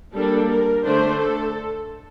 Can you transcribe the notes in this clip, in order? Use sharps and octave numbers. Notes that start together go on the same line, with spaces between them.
G3 A#3 D4 A4
A#4
D3 A3 D4 C5
A4